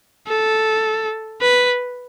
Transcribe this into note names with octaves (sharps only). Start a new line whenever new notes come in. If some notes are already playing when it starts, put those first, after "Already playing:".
A4
B4